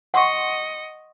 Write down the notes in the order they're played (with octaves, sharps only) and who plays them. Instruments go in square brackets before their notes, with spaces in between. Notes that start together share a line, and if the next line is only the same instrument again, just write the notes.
[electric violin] D#5 C#7 [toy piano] F#5 C6 C#6